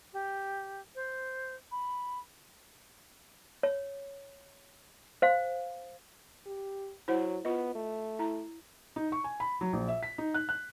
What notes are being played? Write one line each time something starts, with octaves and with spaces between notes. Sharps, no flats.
G4
C5
B5
C#5
C5 F5
G4
F#3 E4 C5 F#5
B3 F4 D#5
A3
E4 A#5
D#4
C#6
G#5
B5
F#3
A#1
E5
B6
D#4
F#6
F#6